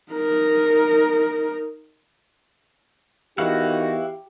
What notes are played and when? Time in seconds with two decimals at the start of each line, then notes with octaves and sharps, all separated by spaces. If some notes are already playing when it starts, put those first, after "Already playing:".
0.12 D#4 A#4
3.38 E2 D#3 D#4 E4 F#4 G4 F5 F#5